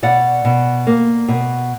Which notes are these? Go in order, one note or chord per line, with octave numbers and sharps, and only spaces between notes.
B2 D5 F#5
B2
A#3
B2